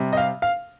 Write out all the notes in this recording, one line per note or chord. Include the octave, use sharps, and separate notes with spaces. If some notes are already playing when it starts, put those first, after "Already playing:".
Already playing: C3 G3
D#5
F5
F5